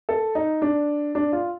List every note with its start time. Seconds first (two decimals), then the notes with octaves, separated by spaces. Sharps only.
0.09 A4
0.35 D#4
0.62 D4
1.15 D4
1.33 F4